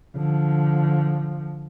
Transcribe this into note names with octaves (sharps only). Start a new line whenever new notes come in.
D3 F3